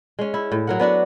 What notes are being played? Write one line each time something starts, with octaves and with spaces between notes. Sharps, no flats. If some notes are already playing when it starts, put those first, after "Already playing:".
G#3 C#4
E4
A2
F#3 A#4 F#5
B3 D4 F#4 B4